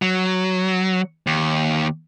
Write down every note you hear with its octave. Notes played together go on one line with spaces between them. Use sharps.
F#3
D#2